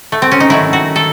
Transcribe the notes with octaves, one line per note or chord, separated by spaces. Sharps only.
A3
C4
C#4
D#4
D#3 F#3 A3 E4
F#4
D#3 A4